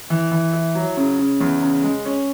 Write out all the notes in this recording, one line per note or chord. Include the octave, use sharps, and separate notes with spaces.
E3
E3
E4
F#3
C#3
C#3
E2
C#3
G#3
C#4